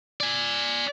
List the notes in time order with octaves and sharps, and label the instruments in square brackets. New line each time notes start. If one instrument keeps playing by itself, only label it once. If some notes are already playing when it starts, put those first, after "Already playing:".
[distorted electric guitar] D5 G#5